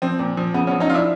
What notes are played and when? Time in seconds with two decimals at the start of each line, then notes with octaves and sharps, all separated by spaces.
0.02 F3 C4
0.19 A#2
0.37 F3
0.54 C#3 B3
0.67 B3 C#4
0.72 F3
0.80 C#4 D#4
0.89 F3 D4 E4 F4